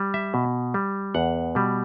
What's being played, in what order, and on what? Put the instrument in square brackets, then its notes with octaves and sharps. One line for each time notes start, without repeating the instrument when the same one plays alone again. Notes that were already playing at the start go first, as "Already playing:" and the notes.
Already playing: [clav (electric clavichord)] G3
E5
B2
G3
E2 F#5
B2 G3